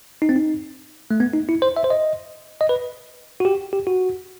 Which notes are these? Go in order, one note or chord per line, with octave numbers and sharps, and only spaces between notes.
D#4
C4
D#4
A3
B3
D#4
E4
C5
E5
C5
D#5
D#5
B4
F#4
G4
G4
F#4